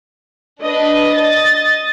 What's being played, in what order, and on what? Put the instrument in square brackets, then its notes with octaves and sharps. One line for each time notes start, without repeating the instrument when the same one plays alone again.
[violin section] D4 B4 [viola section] D#5
[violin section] A6